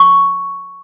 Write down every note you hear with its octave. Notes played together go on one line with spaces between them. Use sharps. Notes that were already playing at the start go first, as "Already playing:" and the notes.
Already playing: C#6